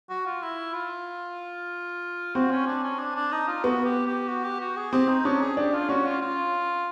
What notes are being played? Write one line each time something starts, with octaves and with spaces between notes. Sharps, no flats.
F#4
F4
E4
F4
C4 F#4
C#4
D4
C#4
D4
D4
D#4
F4
B3 F#4
G4
G4
F#4
G4
F#4
G#4
C4 G4
D#4
C#4 D4
G#4
D4 G4
F4
C#4 F#4
F4
F4